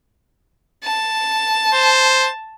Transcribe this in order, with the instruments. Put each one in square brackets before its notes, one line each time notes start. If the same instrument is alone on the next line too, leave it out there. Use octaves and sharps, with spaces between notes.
[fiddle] A5
[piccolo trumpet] C5